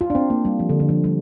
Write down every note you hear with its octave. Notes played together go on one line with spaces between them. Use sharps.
F4
D4
C4
A#3
G3
F3
D3
D3
F3
G3